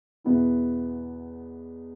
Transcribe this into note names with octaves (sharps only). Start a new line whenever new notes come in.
E2 B2 B3 E4